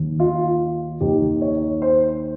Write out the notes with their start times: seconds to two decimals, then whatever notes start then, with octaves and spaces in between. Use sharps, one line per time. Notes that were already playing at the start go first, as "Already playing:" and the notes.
Already playing: D#2 D#3
0.20 F4
1.01 D#2 D#3 G4
1.42 C#5
1.82 C5